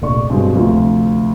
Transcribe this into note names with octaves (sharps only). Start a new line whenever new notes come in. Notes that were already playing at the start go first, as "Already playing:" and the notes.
F1 A#1 D5 C#6
G2 B2 G#3 C4
D2 C3 F3